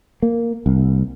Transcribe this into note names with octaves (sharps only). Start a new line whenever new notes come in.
A#3
C2